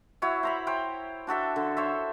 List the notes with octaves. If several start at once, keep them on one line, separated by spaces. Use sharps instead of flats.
E4 F#4 C#5 E5
C5 A#5 B5
C5 C#5 G5
D4 F#4 A4 E5
D3
C5 C#5 E5